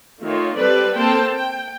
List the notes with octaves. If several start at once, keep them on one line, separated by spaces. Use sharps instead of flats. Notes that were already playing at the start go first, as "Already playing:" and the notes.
D#3 A3 F4 C#5
G3 C4 A4 B4 D5
A#3 C4 A4 C5 G5 A5
G5